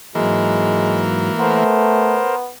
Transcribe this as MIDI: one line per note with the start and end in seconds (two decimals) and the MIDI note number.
0.15 1.29 44
0.15 1.64 52
0.15 1.29 54
0.15 1.03 56
0.15 1.64 58
1.39 2.22 57
1.39 2.50 59
1.39 2.35 70
1.39 2.35 72